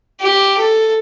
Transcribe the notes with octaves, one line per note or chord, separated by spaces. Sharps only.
G4
A4